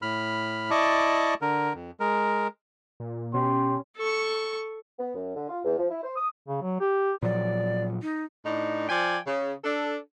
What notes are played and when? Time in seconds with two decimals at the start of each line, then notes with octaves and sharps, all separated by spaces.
0.02 A2 B5 F6
0.70 E4 D5 D#5 A5 C#6 D6
1.42 D3 A#4
1.74 F2
2.00 G#3 A#4
3.00 A#2
3.34 B2 C#4 G4 C6
3.97 A4 C#6
4.98 B3
5.15 F#2
5.35 D3
5.49 F4
5.65 E2
5.78 F3
5.90 E4
6.02 C5
6.16 D#6
6.48 C#3
6.62 F#3
6.80 G4
7.23 A#2 F3 F#3 D5
8.02 D#4
8.45 A2 D4 D#4
8.89 F3 D5 G5 G#5
9.27 C#3
9.64 D4 A4